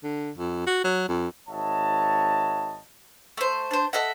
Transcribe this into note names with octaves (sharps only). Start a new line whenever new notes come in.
D3
F2
F#4
F#3
F2
G#1 C#5 D#5 E5 F#5 A5
A3 C5
D4 C5
A4 D#5 E5 F#5